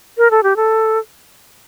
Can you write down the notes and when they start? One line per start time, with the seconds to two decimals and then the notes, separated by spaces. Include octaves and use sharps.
0.18 A#4
0.31 A4
0.43 G4
0.56 A4